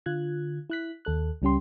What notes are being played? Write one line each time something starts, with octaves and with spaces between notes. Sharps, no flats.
D3 F4 F#6 G#6
E4 F#6 B6
D#2 A4 F#6
C#2 G3 C#4 G4 C6